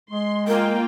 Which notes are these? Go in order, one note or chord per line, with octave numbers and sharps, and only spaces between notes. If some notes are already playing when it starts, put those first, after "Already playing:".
G#3 C6
A#3 F4 A#4 G5